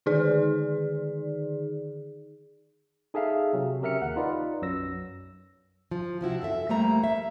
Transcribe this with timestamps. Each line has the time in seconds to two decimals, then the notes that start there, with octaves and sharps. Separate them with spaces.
0.06 D3 D#3 D#4 G#4 D5
3.14 D#4 G#4 A4 E5 F5
3.53 C3 F#3
3.82 C#3 G4 A#4 E5 F6 C#7
4.01 D#2 F#5
4.16 D#4 F4 B4 D5
4.61 B1 F#2 F#3 E6 A#6
5.91 F3
6.21 C3 F3 E4 F#4
6.42 F#2 A4 E5
6.69 F3 G3 A3 A#3 A#5
7.04 E5